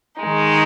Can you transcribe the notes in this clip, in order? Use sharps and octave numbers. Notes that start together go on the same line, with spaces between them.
D#3 G#3 D#4